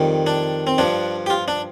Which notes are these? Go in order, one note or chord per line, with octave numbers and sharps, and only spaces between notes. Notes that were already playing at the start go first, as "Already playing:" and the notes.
Already playing: F2 D#3 G3
D4
C4
G2 F3 D4
G4
F4
D4